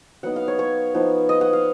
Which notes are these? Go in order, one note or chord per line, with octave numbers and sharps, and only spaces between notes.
F#3 B3 D#4 F#5
F5
C#5
C#5
F3 B3 D#4
D#5
F#5
F5